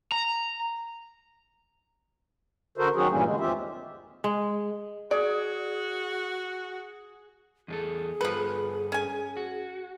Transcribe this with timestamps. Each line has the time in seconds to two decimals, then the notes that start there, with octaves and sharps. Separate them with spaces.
0.12 A#5
2.78 D3 F#4 A4 A#4 C5
2.96 D#3 F#3 C#4 F#4 G#4
3.11 G2 A#2 E3 G3 A#3 C#4
3.25 D3 G#3
3.40 D#2 C4 F4 G4 E5
4.24 G#3
5.11 F#4 G#4 D5
7.68 E2 D4 G#4 A4
8.21 G2 F3 A4 B4
8.92 C#4 G#5
9.37 F#4